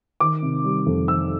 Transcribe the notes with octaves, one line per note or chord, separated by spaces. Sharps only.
D#3 D6
C3
G3
F2
D#3 E6